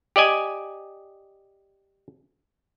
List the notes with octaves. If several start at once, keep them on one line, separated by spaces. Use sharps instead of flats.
G4 D5 D#5 G#5